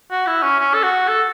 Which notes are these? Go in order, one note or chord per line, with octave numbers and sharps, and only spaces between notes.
F#4
E4
C#4
C#4
A4
F#4
A4